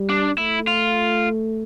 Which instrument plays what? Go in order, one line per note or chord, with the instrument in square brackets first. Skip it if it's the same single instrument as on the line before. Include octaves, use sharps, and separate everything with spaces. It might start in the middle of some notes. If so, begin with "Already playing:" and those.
Already playing: [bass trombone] G3
[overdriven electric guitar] D4
[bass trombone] A3 [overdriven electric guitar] E4
[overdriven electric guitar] F4